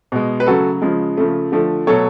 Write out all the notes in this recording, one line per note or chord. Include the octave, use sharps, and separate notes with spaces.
B2 G#3
B4
C#3 F#3 A3 F#4 A4
C#3 F3 G#3
C#3 F3 A3
D3 F3 A3
B2 F#3 A3 A4 C#5